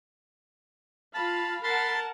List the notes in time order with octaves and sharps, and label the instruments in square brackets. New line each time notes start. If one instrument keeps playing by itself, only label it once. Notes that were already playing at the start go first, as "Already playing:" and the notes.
[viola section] F4 F5 B5 [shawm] A5
[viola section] A#4 F#5 A5 [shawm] B5 [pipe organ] C6 A6